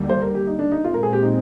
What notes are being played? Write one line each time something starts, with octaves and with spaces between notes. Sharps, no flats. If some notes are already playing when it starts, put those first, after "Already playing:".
Already playing: D#2 D3 G3 A#3
C5
A#4
G4
D#4
D4
D#4
A#2 G#3 C4 F4
A#4
G#4
G4
D#4